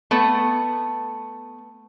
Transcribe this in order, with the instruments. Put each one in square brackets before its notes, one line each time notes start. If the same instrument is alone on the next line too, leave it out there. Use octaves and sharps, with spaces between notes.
[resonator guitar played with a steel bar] A3 B3